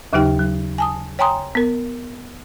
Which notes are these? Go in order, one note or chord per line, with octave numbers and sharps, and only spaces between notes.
D#2 C#3 F#3 D#4 G4 G5
F#3
G#5 A5 D#6
C#5 G5 G#5 A#5 C6 D#6
B3 A#4